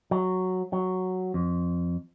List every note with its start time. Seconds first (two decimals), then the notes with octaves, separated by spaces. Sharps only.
0.11 F#3
0.73 F#3
1.34 F2